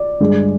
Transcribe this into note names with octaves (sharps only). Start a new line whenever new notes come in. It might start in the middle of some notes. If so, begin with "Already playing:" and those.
Already playing: D5
G2 D3 G#3